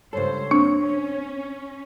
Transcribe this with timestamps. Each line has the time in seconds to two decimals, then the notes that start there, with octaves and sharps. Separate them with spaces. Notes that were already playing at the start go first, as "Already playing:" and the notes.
0.13 C#2 G2 A4 C5 C#5
0.51 A#3 C4 D4
0.83 C#4